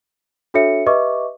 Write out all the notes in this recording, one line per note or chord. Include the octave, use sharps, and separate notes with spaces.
D4 F#4 A4 C#5 E5 C#7
G4 B4 D#5 E5 C#6 D6